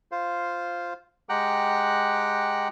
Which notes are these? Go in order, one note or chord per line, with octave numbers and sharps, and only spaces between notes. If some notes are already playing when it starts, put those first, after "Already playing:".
F4 C5 F5
G#3 G4 F#5 G5 A#5 F#6